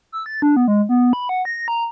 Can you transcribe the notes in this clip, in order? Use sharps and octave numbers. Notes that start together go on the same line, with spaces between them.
E6
A6
D4
B3
G#3
B3
B5
F#5
A#6
A#5